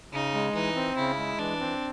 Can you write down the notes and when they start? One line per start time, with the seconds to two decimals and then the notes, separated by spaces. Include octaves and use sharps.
0.13 C#3 D#4
0.34 G#3
0.54 E3 D#4
0.76 C4
0.97 C#3 E4
1.18 G#3
1.39 E3 D4
1.60 C4